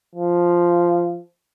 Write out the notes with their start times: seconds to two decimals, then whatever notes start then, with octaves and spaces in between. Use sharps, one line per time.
0.16 F3